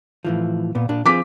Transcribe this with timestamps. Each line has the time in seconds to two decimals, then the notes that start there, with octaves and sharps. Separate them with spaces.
0.24 A2 E3 F3
0.75 A#2 B3
0.89 A#2 D4
1.06 F3 C4 G#4 D6 B6